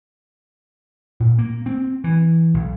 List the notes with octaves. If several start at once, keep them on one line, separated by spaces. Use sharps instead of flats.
A#2
A#3
C4
E3
B1